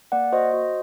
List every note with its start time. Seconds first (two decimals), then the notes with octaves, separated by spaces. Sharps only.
0.12 A#3 D5 F#5
0.32 F#4 C5 D#5
0.54 F#4